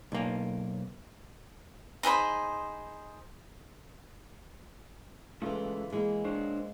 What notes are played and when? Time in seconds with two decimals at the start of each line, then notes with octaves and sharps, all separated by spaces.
0.12 B1 A#3
2.03 D#4 G#4 C5 B5
5.42 C#3 E3 G#3 A3 F4
5.93 E3 G#3 A#3
6.24 D4 C5 C#5